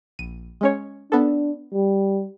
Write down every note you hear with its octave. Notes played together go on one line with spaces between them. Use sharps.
A#1 D#7
G#3 C#4 C#5
B3 D4 A4
G3